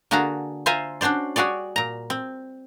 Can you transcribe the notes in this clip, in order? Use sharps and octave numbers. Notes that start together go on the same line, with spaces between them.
D3 A#3 F#4 G#4 A5 A#5
F4 C5 E5 G#5 A#5
C#4 D4 F#4 C5 D5
G3 F#4 G#4 C#5 D5
A#2 A#5
C4